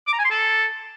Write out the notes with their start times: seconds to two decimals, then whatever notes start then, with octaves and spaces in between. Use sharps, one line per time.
0.07 D6
0.13 A#5
0.19 G#5
0.24 C6
0.30 A4